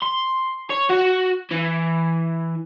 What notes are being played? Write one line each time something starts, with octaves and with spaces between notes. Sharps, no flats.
C6
C#5
F#4
E3